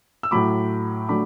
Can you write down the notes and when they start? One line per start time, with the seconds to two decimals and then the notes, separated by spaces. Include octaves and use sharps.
0.23 E6
0.31 A2 F#3 A3 B5 D6
1.09 D3 F#3 A3 B5 D6